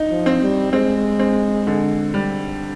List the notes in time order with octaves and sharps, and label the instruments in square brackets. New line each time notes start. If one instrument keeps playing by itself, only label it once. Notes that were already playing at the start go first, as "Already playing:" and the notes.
Already playing: [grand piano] D#4
[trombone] F3
[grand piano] C4
[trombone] G3
[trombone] G#3 [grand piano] C4
[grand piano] C4
D3
G3